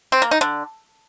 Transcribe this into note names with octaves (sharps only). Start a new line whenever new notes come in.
C4
A#3
D#4
D3